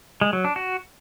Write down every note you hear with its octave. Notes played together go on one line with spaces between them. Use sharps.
G#3
F#3
D4
F#4